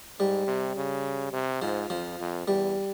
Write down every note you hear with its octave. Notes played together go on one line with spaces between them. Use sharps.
G#2 G3
C3
C#3
C3
G#2 F3
F2 F3
F2
E2 G3